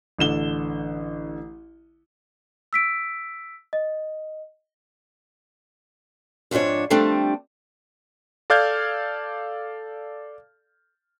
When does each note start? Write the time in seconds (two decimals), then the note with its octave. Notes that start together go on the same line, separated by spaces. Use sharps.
0.19 A1 D3 E7 G7
2.73 E6 B6 D7
3.73 D#5
6.51 F2 G#2 F3 D4 C#5
6.90 F3 G3 A3 C4 D4
8.50 A4 D5 F5 F6 G6 G#6